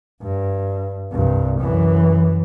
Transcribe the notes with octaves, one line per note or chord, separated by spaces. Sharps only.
G2
C2 G2
F#2 E3